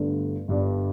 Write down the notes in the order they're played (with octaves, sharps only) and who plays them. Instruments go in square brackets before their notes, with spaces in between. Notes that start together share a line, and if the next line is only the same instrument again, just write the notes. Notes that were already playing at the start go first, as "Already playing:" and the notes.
Already playing: [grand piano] G1 G2 D3 A3
G1 G2 G3 D4